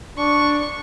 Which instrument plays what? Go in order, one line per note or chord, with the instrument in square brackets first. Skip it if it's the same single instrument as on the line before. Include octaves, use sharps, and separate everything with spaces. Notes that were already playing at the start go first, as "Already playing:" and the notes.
[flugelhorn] D4 [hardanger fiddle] C#6